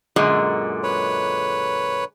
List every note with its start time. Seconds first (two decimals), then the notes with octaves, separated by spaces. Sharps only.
0.16 F#2 A#2 D3 G#3
0.83 B4 C#5